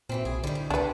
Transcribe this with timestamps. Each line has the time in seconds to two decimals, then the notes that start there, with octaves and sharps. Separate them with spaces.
0.09 F#2 A#2 E3 C4
0.25 B1 G#4
0.44 D3 D#3 G3
0.55 A2
0.70 C#2 G3 D4 B4 F#5